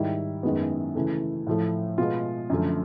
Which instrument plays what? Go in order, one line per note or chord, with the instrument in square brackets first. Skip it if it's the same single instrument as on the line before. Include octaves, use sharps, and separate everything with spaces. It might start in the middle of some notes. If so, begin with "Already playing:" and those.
Already playing: [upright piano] G#2 D#3 G3 E4
F#2 D#3 G#3 B3
C#3 E3 A3
A2 F3 A3
B2 G#3 B3 F4
F#2 D3 F3 A3